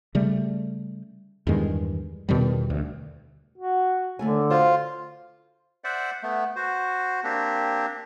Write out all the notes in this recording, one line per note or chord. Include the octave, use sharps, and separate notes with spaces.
C#3 G3 A3
E2 G2 D#3 G#3
E2 B2 D#3 G3
D2
F#4
D#2 D3 A3 G#5
F4 F#4 C5
C5 D5 E5 F#5
A3 B3
F#4 C5
A#3 C4 D4 G4